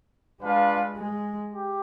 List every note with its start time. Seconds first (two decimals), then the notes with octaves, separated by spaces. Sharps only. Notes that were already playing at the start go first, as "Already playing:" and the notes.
0.41 G#3 D4 F4 B4 F5
0.97 G#3
1.53 G4